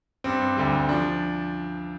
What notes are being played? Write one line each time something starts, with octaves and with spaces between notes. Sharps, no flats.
G2 G3 C4
D2 D3 G3
F3 D4